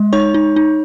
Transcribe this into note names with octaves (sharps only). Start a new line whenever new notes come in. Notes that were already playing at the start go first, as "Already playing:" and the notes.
Already playing: G#3
D#4 C#5 C#6
D#4
D#4